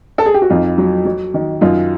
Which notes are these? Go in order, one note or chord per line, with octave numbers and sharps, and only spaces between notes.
A4
G#4
G4
F#4
F2 D#4 F4
F#3
F#3
D#3
F#2 D#4 F4